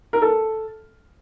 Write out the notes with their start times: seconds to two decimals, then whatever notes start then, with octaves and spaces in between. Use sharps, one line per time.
0.13 A#4
0.22 A4